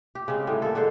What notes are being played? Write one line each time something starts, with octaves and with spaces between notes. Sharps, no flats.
G4
C#3 G#3 C4
A2 D3 G3
A#3 A4
G#2 D3 A4 C5